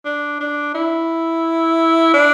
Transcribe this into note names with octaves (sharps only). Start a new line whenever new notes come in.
D4
D4
E4
D4